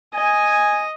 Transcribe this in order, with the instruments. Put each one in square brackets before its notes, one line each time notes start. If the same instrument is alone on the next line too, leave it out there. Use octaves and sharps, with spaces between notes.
[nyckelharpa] D#5 [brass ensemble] G#5